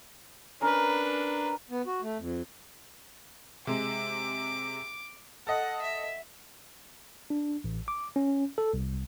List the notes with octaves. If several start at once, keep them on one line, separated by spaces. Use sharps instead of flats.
C#4 D4 A#4 B4
B3
F#4
A3
F2
C3 G#3 D6
A4 D#5 F#5
E5
D4
A1
D6
C#4
A4
C2